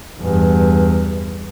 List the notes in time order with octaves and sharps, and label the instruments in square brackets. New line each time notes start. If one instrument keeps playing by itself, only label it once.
[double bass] E2 G2